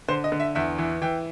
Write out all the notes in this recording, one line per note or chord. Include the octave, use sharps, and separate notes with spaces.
D3 C5
D#5
D3
E5
E2 E5
E3
E3 G5